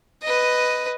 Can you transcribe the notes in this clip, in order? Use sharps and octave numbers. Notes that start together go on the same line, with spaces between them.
B4 D#5